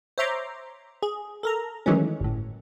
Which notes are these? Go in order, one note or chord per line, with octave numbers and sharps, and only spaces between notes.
C5 C#5 E5 A#5 C6 D6
G#4
A4 A#4 A#5
D#3 E3 F#3 G#3 A3 C#4
G1 A2